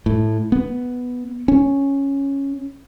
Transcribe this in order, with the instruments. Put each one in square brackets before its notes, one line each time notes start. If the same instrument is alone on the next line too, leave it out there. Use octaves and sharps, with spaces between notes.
[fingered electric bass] A2
B3
C#4